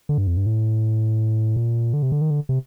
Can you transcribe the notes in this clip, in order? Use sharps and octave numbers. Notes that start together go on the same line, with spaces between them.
D3
G2
F2
G2
A2
A#2
D3
C3
D3
D#3
D3
C3